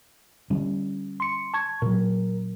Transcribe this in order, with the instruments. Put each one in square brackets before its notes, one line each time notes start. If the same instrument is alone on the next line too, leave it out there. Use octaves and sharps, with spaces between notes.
[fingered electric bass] D3 G3 C#4
[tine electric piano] C6 C#7
A5 C#6 G#6
[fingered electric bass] A#2 F#3 [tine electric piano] A#4